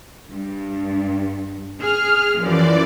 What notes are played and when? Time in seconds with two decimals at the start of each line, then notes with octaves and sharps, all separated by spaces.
0.31 G2
1.81 G#4 F6
2.40 F#2 E3 F3 D5